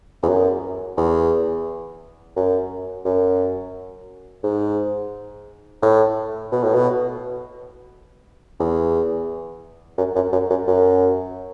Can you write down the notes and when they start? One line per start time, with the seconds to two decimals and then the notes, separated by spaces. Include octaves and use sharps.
0.23 E2
0.28 F#2
0.97 E2
2.36 F#2
3.05 F#2
4.44 G#2
5.82 A2
6.52 B2
6.63 A2
6.74 B2
8.60 E2
9.98 F#2
10.16 F#2
10.33 F#2
10.50 F#2
10.68 F#2